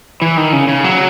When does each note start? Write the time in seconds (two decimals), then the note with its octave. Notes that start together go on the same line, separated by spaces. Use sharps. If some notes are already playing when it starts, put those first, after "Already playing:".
0.22 E3
0.37 D#3
0.53 C#3
0.68 C#3
0.84 F#3